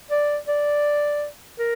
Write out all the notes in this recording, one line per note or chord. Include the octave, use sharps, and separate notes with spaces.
D5
D5
A#4